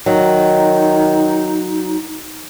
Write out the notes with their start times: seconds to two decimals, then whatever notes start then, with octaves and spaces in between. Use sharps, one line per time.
0.06 D#3 F#3 D#4